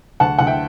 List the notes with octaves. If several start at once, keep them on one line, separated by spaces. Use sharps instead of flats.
D2 F#5 A5
D2 F#5
E5 G5